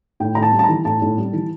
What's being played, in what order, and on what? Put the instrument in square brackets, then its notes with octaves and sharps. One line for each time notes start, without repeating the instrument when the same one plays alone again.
[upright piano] A2 G5
A2 A#5
A5
G3
A5
E3 A#5
A2 A5
A2
G3
E3